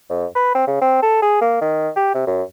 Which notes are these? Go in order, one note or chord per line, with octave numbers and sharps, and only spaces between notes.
F2
B4
C4
C#3
C4
A4
G#4
A#3
D#3
G4
C3
F#2